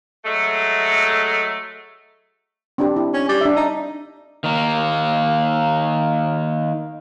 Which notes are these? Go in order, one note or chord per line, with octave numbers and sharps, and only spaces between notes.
F#3 G#3 A3
C4 D4 G4
E4
C#4
G3
D4 E5
D#4
D#3 A#3